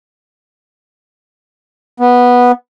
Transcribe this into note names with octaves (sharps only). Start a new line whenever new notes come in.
B3